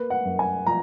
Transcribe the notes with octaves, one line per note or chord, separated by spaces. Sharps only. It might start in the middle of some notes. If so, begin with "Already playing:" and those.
Already playing: A#3 B4
F#5
F#2
G#5
F3 A#5